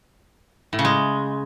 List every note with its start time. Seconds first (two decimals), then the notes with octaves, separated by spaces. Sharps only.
0.73 A2
0.79 C#3
0.85 G#3